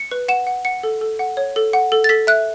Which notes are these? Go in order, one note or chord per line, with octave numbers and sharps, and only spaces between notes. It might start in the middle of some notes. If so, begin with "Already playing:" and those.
Already playing: C#7
B4
F#5 E7
F#5
F#5 C#7
A4
A4
F#5
C#5
A4
F#5
A4
A6
A4 B6
E5 F#6